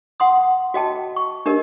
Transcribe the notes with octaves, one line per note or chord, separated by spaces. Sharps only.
F#5 C6 D#6
F#4 D#5 G5 A5
C#6
D4 G4 A#4 D#5